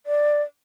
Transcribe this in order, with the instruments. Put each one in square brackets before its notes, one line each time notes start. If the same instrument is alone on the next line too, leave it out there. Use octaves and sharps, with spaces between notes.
[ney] D5